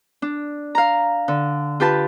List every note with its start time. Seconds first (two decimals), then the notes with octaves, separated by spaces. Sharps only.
0.22 D4
0.75 F5 A#5
1.28 D3
1.80 F4 G4 B4 A5